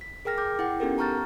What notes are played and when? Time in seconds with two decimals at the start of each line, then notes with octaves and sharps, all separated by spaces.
0.01 B6
0.25 G#4 A#4 G5 F6 A#6
0.38 D6 G6
0.59 E4 F#5 G5
0.80 B3 C#4 D#4 G4 A4 A#4
0.98 A5 A#5 C#6 F6 G6 A6